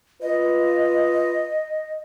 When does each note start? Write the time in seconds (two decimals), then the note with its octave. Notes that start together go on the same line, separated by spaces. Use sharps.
0.22 F4 B4 D#5